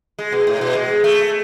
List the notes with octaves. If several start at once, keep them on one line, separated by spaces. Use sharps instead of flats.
G#3
B2
A2
B2
G#3
A3